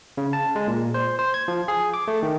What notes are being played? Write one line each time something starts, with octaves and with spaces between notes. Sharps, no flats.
C#3
A5
G#3
A#2
C5
C5
G#6
F3
G#4
D6
A3
D#3